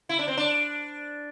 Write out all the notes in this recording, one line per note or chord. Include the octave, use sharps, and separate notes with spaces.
E4
D4
C4
D4